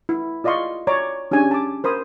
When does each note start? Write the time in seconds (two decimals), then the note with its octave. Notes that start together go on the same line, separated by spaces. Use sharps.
0.09 E4
0.44 F4 D5 D#5 F5 C6 C#6
0.87 C#5 D5 A#5 D6
1.31 C#4 D4 G4 G#5
1.51 A5 D6
1.84 A#4 C5 B5 D#6